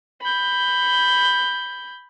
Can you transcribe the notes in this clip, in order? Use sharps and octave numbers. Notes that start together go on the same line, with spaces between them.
B5 G6